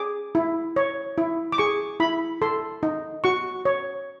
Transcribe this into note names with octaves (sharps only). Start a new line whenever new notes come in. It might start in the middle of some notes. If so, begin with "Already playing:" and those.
Already playing: G#4 D6
E4
C#5
E4
D6
G#4 C#6
E4 B5
A4 C6
D#4
F#4 C#6
C#5